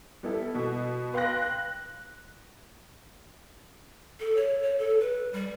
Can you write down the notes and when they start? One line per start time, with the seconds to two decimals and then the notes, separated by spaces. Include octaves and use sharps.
0.23 G3 B3 E4 A4
0.54 B2 B3
1.14 B4 F5 G5 C6 F#6 A#6
1.42 F#6
4.20 A4
4.37 C#5
4.62 C#5
4.79 A4
5.01 B4
5.33 G3